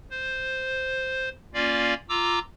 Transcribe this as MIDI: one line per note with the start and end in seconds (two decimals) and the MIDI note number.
0.11 1.29 72
1.54 1.94 58
1.54 1.94 61
1.54 1.94 65
1.54 1.94 74
1.54 1.94 77
2.09 2.39 65
2.09 2.39 82
2.09 2.39 86
2.09 2.39 88